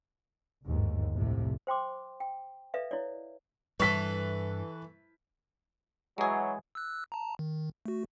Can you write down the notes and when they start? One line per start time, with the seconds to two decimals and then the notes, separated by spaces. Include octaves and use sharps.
0.65 G1 D#2 G#2
1.15 C2 F2 A2 C3
1.67 C5 G5 C6 D6
2.20 G5
2.74 A4 B4 D5 E5 F5
2.91 E4 C#5 D5
3.80 G2 E3 G3 A4 B4 C#6 B6
6.18 E3 F#3 G#3 G#4
6.75 E6 F#6
7.12 A5 A#5
7.39 D#3
7.86 A3 F#4